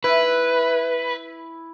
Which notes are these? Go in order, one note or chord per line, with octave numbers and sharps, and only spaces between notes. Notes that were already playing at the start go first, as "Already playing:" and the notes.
E4 B4